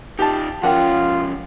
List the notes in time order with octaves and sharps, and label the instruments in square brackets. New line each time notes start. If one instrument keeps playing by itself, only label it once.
[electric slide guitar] D#4 F4 [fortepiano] G4 A5
[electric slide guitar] F3 C#4 [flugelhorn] F4 [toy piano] G#4 A#4 G5 [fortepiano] F#5